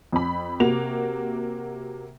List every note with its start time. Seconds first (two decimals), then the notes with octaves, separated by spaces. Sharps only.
0.12 F2 B5
0.60 C3 A#3 F#4 F7